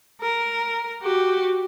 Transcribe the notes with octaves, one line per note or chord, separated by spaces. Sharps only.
A#4
F#4 G4